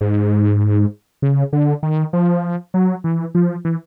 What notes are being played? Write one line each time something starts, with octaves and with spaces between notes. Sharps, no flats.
G#2
C#3
D3
D#3
F3
F#3
E3
F3
E3